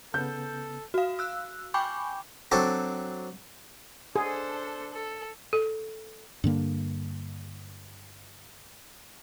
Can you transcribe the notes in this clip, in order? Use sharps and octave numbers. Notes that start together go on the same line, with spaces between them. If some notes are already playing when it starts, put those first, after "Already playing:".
C#3 B3 A4 G6
F#4 F5
E6 F#6
G5 G#5 B5 C#6 D6 G6
F#3 C4 D4 F#4 A4
D4 G#4 A4 C5
A4
A4
G2 D3 A#3